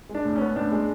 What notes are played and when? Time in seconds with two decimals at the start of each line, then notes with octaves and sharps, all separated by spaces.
0.09 G#3
0.15 D4
0.25 A2
0.36 C#4
0.41 B3
0.56 A2 D4
0.72 G#3